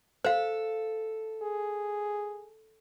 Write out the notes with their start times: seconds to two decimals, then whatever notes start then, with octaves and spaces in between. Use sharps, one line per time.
0.25 A4 C5 F5
1.43 G#4